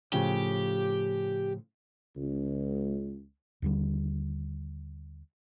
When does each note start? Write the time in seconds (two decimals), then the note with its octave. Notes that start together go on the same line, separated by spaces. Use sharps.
0.13 A2 C#3 F3 G4
2.17 C#2
3.62 D#2 D3 G3